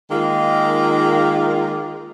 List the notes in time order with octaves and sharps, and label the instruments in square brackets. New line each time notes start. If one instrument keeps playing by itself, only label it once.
[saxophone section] D#3 G#3 A#3 F4